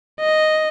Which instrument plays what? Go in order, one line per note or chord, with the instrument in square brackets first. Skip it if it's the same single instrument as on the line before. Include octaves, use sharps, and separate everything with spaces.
[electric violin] D#5